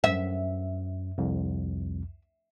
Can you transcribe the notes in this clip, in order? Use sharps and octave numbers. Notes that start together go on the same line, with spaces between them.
F#2 E5
C2 F2